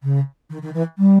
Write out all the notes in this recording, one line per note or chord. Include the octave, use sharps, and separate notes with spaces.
C#3
D#3
D#3
E3
G3